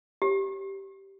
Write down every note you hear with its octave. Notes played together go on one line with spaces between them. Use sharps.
G4